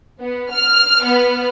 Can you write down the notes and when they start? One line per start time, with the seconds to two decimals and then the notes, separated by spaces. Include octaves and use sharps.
0.20 B3
0.50 F6
1.04 B3